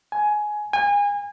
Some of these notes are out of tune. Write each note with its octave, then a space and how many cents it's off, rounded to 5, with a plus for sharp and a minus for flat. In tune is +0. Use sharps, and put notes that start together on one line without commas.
G#5 +15
G#5 -30